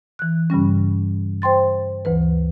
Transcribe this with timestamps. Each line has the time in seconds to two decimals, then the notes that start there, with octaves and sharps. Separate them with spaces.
0.19 E3 F#6
0.50 G2 C#3 G3 C#4
1.42 C5 G5 C6 A6
2.05 D2 E3 B4